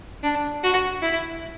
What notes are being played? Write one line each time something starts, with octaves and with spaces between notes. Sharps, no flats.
D4
F#4
E4